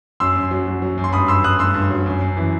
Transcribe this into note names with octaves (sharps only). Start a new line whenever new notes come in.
F#2 C6 E6
F#2
F#3
F#3
F#3
F#2
C6
G2 B5 D#6
G2 C6 E6
G2 D#6 F#6
G2 C6 E6
G2
F#3
F#2
F#2
E3